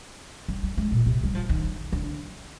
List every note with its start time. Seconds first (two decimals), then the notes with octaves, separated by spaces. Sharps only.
0.48 G3
0.63 G3
0.78 G#3
0.91 A#2
1.06 C3
1.24 G3
1.35 F3
1.49 D#3
1.93 D3